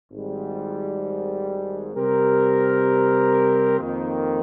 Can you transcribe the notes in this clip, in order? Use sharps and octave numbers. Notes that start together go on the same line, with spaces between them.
G#1 G#2 G3
C3 G3 C4 G4 A#4
F2 D#3 A#3